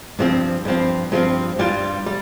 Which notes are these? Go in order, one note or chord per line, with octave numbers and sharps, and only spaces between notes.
G2 F3 C4
G2 F3 C4
G2 F3 C4
G2 G3 F4
G3